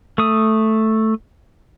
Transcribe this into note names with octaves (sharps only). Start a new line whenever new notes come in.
A3 D#6